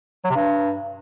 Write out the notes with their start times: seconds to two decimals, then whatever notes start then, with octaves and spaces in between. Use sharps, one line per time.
0.24 F#3
0.30 C3
0.36 G2